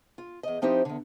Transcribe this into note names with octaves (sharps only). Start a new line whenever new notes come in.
F4
E2 D#5
F3 C4 D#4 E4 G4 C5
E2 D3